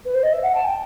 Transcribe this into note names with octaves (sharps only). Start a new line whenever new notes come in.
B4
C5
D#5
E5
F#5
A5
G5